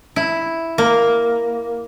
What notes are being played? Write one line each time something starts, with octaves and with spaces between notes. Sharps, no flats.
E4
A#3